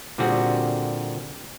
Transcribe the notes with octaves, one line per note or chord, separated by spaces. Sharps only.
A#2 D3 G3 C4 F#4 G#4